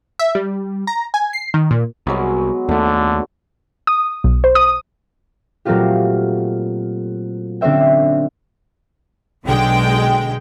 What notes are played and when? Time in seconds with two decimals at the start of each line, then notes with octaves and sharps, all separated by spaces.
0.19 E5
0.35 G3
0.87 A#5
1.14 G#5
1.33 C7
1.54 D#3
1.71 A#2
2.07 C2 F#3 G#3 B3
2.69 D#2 D3 A3
3.87 D#6
4.24 B1
4.44 C5
4.55 D#6
5.65 A#2 F#3 A3 C4 F4 G4
7.61 D3 C4 C#4 C5 E5 G5
9.44 B1 D3 G#3 G5